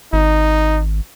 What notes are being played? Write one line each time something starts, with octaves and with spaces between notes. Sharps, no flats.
G#1 D#4